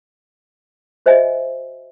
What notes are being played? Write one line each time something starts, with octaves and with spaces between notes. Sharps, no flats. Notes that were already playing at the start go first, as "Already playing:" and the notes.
F#4 C5 D#5 E5 G#5